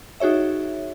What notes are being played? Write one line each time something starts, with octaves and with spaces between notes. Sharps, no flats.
D#4 F#4 G#4 C#5 E5